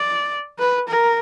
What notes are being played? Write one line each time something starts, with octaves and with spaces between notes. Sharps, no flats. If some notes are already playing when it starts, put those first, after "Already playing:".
Already playing: D5
B4
A#4